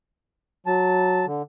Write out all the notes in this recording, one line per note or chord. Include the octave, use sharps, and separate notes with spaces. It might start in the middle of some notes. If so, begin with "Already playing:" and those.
F#3 A5
D3